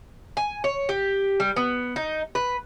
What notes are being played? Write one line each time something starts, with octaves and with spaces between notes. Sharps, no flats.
G#5
C#5
G4
G3
B3
D#4
B4